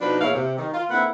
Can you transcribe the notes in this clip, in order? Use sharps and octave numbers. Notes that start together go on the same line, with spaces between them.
B2 F3 D4 D#4 F#4 B4
E2 A#2 E4 C#5 F5
C3
D#3
F4
D3 A#3 C4 E4 B4 F#5